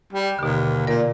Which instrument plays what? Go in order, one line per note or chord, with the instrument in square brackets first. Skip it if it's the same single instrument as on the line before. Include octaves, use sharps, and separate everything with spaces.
[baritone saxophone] G3
[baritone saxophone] D#2 [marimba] B2 D3
[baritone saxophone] A#2 [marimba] A#4 D5